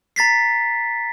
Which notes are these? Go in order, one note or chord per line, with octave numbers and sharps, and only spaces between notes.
A#5 A6 B6 C7